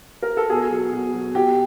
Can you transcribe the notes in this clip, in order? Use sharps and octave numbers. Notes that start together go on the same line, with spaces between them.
A#4
A4
B2 G#4
F#3
B2
F#3
B2 G4